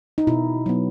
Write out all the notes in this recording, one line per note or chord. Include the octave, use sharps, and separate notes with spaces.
D#4
B2 E4
F#3 B3